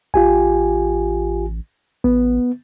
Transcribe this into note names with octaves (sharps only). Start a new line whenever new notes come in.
A1 F4 G4 G#5
A1 B3